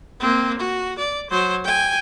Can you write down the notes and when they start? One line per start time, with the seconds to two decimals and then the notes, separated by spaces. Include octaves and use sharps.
0.20 A#3 C4
0.59 F#4
0.98 D5
1.30 F#3 C5
1.64 G5 G#5